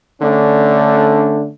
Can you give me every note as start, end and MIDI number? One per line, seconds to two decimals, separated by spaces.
0.22 1.50 50
0.22 1.50 57
0.22 1.50 61
0.22 1.50 62